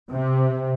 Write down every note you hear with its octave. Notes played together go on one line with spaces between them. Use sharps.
C3